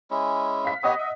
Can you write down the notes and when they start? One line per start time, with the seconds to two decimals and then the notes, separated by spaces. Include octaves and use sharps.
0.11 G#3 C#4 E4
0.64 F5 B6
0.83 B3 G4 C#5 D#5 F#5 D#6
0.99 E5